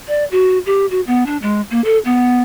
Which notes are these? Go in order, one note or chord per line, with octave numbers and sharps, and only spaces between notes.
D5
F#4
G4
F#4
B3
D4
G#3
A#3
A4
B3